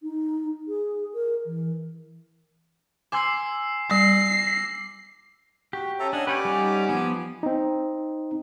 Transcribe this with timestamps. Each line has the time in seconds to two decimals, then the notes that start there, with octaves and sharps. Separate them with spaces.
0.03 D#4
0.68 G#4
1.14 A#4
1.46 E3
3.12 G#5 C6 D6 E6 G#6 C7
3.91 G3 A#6 C7
5.73 F#4 G4
6.00 C#4 A4 E5 A#5
6.13 D4 D#5 F#5 G#5
6.27 C#4 G4 B4 C#5 D5 F#5 G5 D6
6.45 G3 D#4
6.89 F3 B3 G#5
7.43 C4 D#4